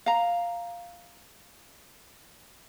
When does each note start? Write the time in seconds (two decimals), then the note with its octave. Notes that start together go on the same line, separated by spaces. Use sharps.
0.06 F5 A#5